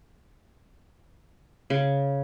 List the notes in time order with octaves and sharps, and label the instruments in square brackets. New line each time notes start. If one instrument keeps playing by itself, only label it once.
[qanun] C#3